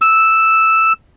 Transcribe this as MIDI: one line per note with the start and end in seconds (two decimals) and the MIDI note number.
0.01 0.93 88